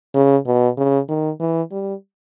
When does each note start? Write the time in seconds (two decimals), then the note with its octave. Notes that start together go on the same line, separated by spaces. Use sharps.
0.15 C#3
0.47 B2
0.77 C#3
1.08 D#3
1.40 E3
1.72 G3